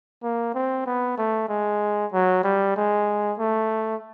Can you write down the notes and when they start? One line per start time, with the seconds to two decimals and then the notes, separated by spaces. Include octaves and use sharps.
0.23 A#3
0.54 C4
0.86 B3
1.18 A3
1.49 G#3
2.13 F#3
2.44 G3
2.76 G#3
3.39 A3